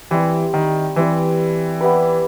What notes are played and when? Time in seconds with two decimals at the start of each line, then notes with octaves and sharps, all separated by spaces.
0.11 E3 G3 C4 E4
0.54 D#3
0.96 E3 G3 C4 E4 B4
1.81 B3 E4 G4 B4